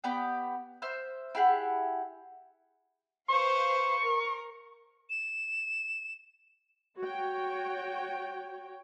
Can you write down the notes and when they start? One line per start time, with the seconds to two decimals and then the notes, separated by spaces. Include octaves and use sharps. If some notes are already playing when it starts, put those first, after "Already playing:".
0.04 B3 G4 D5 G5
0.82 C5 E5 F6
1.35 E4 G4 G#4 F#5
3.29 B4 C5 F5 C#6
3.99 A#4
5.10 E7
6.98 F#4 C#5 G5